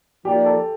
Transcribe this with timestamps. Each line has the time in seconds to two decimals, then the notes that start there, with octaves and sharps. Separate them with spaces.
0.25 F3 A#3 D#4 G4 A#4 D5 G5
0.45 A4 A5